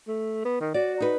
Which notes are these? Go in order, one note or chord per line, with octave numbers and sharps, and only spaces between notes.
A3
B3
D#3
F#4 D5
D#4 B4